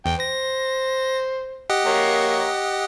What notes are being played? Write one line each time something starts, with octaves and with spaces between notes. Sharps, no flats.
E2 G5
C5 A#6
G4 D#5 F#5
A#3 C#5 A#5